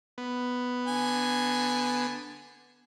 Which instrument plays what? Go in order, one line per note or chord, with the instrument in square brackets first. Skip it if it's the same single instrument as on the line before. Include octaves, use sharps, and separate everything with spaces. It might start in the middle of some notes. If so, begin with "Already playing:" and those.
[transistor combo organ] B3
[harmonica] D3 G#5